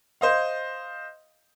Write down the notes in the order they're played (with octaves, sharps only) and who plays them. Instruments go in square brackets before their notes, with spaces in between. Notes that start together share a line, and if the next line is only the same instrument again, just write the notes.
[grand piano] C5 D#5 F5